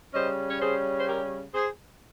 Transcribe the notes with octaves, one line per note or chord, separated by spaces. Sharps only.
C#3 G3 C#4 C5 D#5
C#5
G#4 C5
C5
G4 A#4
G#4 C5